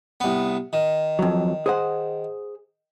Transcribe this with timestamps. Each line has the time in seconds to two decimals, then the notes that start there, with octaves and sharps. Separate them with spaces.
0.20 C2 B3
0.73 D#3
1.19 F2 F#3
1.66 G#4 C5 F#5